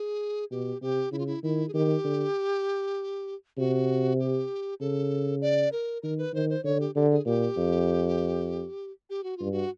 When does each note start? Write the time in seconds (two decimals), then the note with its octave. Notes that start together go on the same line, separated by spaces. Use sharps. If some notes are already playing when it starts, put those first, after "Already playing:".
Already playing: G#4
0.51 B2 G4
0.82 C3 G4
1.12 C#3 E4
1.19 F4
1.27 E4
1.43 D#3 E4
1.69 G#4
1.73 D#3 G4
2.04 D3
3.58 C3 F#4
4.19 G4
4.80 C#3 A4
5.41 D5
5.72 A#4
6.03 D#3 A#4
6.18 B4
6.33 D#3 C5
6.50 C5
6.64 D3 C#5
6.80 G4
6.95 D3 G4
7.10 G#4
7.25 A#2 G4
7.57 F2
9.10 G4
9.24 F#4
9.37 G2 F4
9.52 F#4